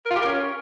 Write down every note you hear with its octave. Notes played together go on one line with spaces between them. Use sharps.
A#4
F4
G4
A#4
C#4